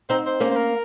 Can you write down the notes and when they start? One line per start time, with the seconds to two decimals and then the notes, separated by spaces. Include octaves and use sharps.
0.10 C4 D#4 C5
0.26 C5
0.40 A#3 C#4
0.51 C5
0.56 A#4